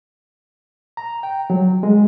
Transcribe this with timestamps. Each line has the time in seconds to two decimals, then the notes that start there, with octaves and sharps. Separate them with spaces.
0.97 A#5
1.23 G5
1.50 F#3
1.83 G#3